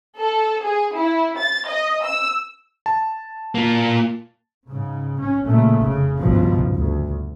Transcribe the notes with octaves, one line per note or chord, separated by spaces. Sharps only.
A4
G#4
E4
A6
D#5
E6
A5
A#3 F4
G#2 C#3
C#4
A#2 C#3 A3
F1 C#3
G#1 C#2 G2 B2 F3
D2